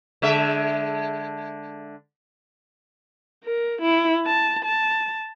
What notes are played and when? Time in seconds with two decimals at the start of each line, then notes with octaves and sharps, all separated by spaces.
0.22 D3 G#3 E5
3.44 A#4
3.81 E4
4.25 A5
4.64 A5